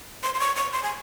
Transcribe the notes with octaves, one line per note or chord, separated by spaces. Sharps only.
C6
C6
C#6
C#6
C6
G#5